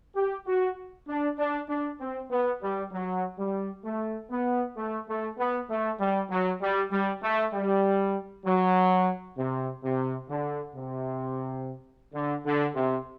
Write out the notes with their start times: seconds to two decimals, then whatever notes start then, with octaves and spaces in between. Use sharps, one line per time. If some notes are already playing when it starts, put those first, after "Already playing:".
0.15 G4
0.47 F#4
1.08 D4
1.38 D4
1.69 D4
2.00 C4
2.30 B3
2.62 G3
2.92 F#3
3.38 G3
3.84 A3
4.30 B3
4.76 A3
5.07 A3
5.37 B3
5.69 A3
5.99 G3
6.30 F#3
6.61 G3
6.91 G3
7.22 A3
7.53 G3
8.45 F#3
9.37 C3
9.84 C3
10.29 D3
10.75 C3
12.13 D3
12.45 D3
12.75 C3